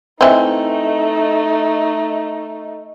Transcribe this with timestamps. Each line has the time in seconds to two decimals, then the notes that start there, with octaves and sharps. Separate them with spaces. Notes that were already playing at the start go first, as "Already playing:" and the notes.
0.21 E3 A3 C4 D#4 D#5